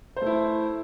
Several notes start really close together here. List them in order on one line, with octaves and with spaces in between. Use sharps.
C5 A3 E4